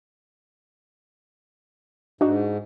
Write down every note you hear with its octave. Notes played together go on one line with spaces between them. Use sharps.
G#2 D4 D#4 F#4